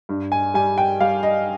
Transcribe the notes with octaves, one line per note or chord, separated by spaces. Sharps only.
G2
G#5
G3 G#5
G5
G3 F5
D#5